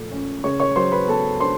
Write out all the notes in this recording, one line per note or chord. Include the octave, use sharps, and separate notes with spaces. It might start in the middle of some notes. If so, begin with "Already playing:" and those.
Already playing: A#2 F3 A3
C#4
C#3 C#5 C#6
C#5 C#6
F#3 C5 C6
B4 B5
B3 A4 A5
D4 C5 C6